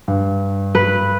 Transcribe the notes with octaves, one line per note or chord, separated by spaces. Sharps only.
G2
B4